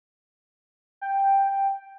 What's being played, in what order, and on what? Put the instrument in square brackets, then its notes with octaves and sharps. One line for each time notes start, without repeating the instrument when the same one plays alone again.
[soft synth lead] G5